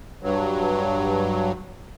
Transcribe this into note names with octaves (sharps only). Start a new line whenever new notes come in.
G2 F#3